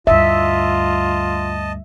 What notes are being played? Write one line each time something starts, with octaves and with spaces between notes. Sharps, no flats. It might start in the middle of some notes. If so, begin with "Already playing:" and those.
D2 G2 F4 D#5 E5 A5